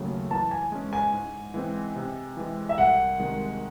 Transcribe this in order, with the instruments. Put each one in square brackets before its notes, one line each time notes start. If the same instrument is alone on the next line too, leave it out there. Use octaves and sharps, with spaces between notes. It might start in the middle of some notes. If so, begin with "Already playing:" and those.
Already playing: [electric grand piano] D#2 C#3 F#3 A3
[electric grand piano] E3 [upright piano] A5
[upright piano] G#5
[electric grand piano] G#3 C#4
[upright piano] G#5
[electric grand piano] G#2
E3 G#3 C4
C3
E3 G#3
[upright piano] E5
[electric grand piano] C2 [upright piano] F#5
[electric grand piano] C3 D#3 G#3